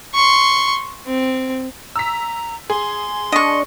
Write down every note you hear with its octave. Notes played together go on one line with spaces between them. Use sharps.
C6 C#6
C4
A#5 E6 B6
G#4 C6
D4 D#5 C#6